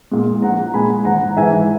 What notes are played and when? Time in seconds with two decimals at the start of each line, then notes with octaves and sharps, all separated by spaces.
0.11 A#2 G#3
0.42 A#1 F#5 A#5
0.74 A#2 G#3 G#5 B5
1.05 G#1 F#5 A#5
1.37 G#2 E3 E5 G#5